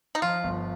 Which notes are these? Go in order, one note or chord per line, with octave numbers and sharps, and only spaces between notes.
D#4
F3 F4
G1